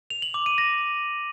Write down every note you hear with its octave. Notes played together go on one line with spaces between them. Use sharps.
F7
F#7
D6
D#7
A#6